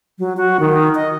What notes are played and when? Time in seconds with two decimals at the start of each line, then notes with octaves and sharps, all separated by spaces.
0.19 F#3
0.37 F#4
0.60 D#3
0.95 D#5